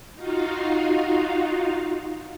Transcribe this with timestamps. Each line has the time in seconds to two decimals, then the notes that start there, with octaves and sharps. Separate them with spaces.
0.15 D#4 F4 F#4 F5